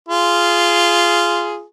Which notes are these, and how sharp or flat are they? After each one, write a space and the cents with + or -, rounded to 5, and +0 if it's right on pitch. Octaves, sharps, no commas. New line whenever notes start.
F4 -10 G#4 +0